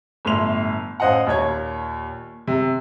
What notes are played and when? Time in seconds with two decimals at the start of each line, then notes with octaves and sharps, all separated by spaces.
0.25 G1 A2 C6 F7
1.00 A1 C5 D#5 F5 F#5
1.27 D#2 A#2 C#5 G#6
2.47 C3